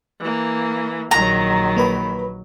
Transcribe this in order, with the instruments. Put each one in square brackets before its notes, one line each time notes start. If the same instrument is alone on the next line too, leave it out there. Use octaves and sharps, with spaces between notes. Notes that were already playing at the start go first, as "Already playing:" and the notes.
[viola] E3 A#3
[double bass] A#1 F#3 [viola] D#3 [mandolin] A#5
[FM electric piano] A#3 B4 B5